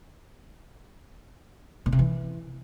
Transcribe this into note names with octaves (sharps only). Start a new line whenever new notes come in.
A#2
C3
E3